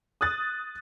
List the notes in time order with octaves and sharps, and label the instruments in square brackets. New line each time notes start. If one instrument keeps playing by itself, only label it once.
[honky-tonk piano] D#6 F#6 A6